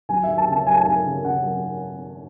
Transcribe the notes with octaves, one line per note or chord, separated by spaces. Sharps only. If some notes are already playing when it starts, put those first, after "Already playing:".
F#3 G#5
F#3 E5
A5
C#3 A5
F#3 G#5
A5
F#3 G#5
C#3
C#3 F#5
F#3